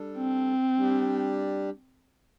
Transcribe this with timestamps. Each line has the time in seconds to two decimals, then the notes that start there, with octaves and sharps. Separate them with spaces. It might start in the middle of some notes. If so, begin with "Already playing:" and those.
Already playing: G3 D4 A4
0.17 C4
0.76 G3 D4 G4